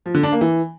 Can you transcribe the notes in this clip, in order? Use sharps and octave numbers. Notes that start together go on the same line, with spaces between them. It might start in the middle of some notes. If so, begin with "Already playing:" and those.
F3
D3
D4
A#3
E3